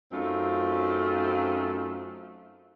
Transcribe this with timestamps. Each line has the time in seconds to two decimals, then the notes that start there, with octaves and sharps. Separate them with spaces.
0.12 F#2 A3 C4 D#4 F4